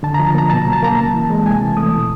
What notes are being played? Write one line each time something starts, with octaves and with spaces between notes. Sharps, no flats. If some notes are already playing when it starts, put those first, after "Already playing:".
D3 A5
F3 A#5
A5
A#3 A#5
B2 A5
A#5
F#3
A5
A#3 A#5
C#3 A5
E3
G#3
C3 G#5
E3 A5
A3 D#6
B2